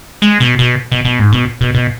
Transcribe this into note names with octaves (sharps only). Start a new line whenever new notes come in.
G#3
B2
B2
B2
B2
G#2
B2
B2
B2